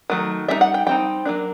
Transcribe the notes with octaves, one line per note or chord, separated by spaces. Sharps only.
D#3 F#3 A3
G3 C4 D#4 E5
F#5
G5
G3 C4 D#4 G5
F#3 A#3 D4